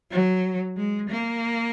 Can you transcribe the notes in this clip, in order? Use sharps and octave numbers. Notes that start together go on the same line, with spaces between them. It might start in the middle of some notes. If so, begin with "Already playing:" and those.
F#3
G#3
A#3